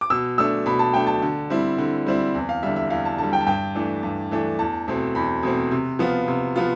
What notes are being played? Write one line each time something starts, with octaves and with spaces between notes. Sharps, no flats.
D6
B2 E6
A3 D4 E6
B2 B5
A5
A3 D4 G5
A5
D3
G3 C4 E4
D3
G3 C4 E4
E2
F5
D3 G3 E5
E5
E2 F5
A5
D3 G3 A5
G5
A5
G2 G5
E3 A3 D4
G2
E3 A3 D4
E2 A5
B2 A3 C4
E2 B5
B2 A3 C4
C3
F3 B3 F4
C3
F3 B3 F4